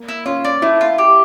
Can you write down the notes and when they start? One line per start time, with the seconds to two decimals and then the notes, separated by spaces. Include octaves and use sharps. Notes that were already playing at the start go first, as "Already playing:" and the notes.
Already playing: A#3
0.09 E4
0.26 C#4 F4
0.45 D5
0.62 A3 E4
0.81 F4
0.98 G4